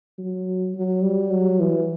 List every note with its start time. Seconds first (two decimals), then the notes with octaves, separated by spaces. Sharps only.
0.18 F#3
0.75 F#3
1.03 G3
1.31 F#3
1.60 E3